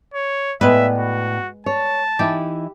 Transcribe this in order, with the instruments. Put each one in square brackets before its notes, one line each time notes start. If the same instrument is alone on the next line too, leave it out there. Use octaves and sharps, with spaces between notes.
[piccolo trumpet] C#5
[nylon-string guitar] A2 B3 D5 [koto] G#3 B4 [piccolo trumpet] E5
[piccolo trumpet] F#4
[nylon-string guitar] C#5 [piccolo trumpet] A5
[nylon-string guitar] E3 D#4 E4 [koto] G4